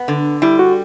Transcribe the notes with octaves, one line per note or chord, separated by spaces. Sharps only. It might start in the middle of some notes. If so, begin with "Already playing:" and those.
Already playing: B3
D3
G3 E4
F#4